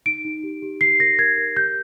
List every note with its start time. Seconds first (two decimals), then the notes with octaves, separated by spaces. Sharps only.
0.06 D#4 D7
0.25 D#4
0.43 G4
0.62 G4
0.81 G4 C7
1.00 A#4 A#6
1.19 A#4 G#6
1.38 A#4
1.56 G4 G6